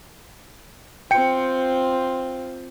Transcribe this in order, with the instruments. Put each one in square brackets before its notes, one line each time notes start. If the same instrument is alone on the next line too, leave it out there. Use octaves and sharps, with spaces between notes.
[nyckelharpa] C4 F4 [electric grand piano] G5 C#7